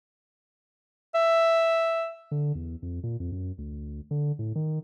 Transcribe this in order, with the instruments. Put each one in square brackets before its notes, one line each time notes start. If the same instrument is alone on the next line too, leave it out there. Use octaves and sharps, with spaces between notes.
[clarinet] E5
[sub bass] D3
E2
F2
A#2
F2
F#2
D2
D3
A2
D#3